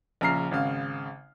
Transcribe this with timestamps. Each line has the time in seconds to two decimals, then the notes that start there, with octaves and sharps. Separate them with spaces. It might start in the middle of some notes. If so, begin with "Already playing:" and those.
0.21 A#1 C#3 A#5 F6 C7
0.51 G#1 C#3 F5